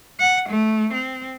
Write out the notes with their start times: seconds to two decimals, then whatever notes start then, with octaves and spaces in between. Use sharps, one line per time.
0.19 F#5
0.48 A3
0.93 C4